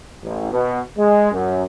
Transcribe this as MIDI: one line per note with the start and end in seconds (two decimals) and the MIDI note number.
0.23 0.49 33
0.52 0.80 47
0.98 1.32 56
1.32 1.63 42